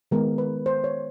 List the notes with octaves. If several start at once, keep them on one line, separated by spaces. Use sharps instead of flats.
D#3 G#3 B3 A#4
B4
C5
C#5